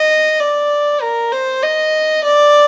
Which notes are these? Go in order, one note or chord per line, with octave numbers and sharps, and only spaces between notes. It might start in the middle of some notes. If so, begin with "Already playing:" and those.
Already playing: D#5
D5
A#4
C5
D#5
D5